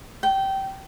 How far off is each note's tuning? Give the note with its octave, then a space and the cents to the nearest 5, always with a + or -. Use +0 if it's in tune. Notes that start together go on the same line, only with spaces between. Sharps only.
G5 -20